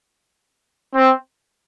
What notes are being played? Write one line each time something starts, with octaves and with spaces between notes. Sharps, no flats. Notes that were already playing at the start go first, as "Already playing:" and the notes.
C4